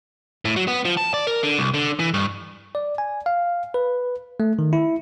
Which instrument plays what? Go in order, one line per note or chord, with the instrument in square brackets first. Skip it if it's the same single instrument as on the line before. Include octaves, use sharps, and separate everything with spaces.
[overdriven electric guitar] A2
F#3
B3
F3
A5
D5
A#4
D3
C2
D3
E3
G2
[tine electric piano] D5
G#5
F5
B4
A3
D#3
E4